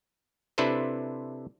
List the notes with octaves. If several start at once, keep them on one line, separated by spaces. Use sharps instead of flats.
C3 D4 E4 A4 B4 C5